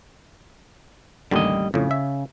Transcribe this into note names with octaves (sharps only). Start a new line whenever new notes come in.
A1 D#2 D3 G3 D#5
F2 A2 C#3
E5